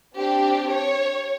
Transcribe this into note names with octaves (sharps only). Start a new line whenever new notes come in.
C4 D4 G4
C#5